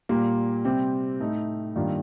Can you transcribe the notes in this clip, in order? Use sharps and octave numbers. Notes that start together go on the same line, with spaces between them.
A#2 G3 A#3
C3 G3 C4
A2 A3 D#4
G2 D#3 A#3 D4 F4